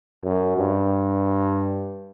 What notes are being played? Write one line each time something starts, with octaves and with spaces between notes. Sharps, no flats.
F#2
G2